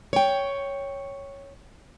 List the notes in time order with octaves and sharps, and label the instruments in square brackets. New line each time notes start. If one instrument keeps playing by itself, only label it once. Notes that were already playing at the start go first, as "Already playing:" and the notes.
[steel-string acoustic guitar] C#5 G5